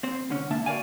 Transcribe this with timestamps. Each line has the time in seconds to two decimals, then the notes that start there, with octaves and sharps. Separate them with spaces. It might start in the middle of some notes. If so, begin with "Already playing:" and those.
0.03 C4 C5
0.29 C2 D3 C#4
0.50 G#2 D3 A#3 D4 E5 A5
0.66 F#4 A#4 C5 D5 F5 G#5